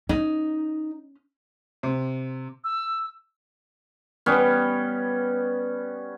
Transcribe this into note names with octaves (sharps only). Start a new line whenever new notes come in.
C#4 D#4
C3
E6
G3 B3 C#4